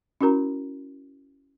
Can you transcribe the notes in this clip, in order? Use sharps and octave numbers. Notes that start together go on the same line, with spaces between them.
C#4 E4 F#4 A#4 A#5